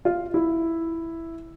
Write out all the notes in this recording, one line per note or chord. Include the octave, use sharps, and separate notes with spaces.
F4
E4